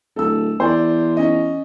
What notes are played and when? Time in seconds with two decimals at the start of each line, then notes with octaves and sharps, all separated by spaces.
0.16 D1 A4 E6
0.60 E2 C5 D5
1.17 C#4 D#5